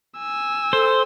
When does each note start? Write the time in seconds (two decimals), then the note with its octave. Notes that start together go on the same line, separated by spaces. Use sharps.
0.18 G#5 E6
0.73 A4 C5